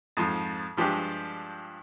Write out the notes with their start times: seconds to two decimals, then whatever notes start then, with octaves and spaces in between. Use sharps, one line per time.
0.17 F2 G#2 F3
0.77 G2 F3 G#3 D4 G4